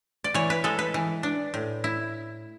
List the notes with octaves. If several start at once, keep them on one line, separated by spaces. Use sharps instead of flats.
D5
E3 C#5
B4
G#3 A4
B4
E3
D4
A2
E4